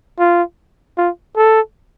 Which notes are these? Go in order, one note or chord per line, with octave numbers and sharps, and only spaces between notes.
F4
F4
A4